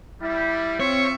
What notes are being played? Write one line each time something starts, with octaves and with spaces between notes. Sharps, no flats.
G3 E4
C4 F4 C#5 E5 C#6